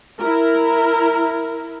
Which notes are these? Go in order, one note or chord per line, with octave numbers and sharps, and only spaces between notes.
E4 A#4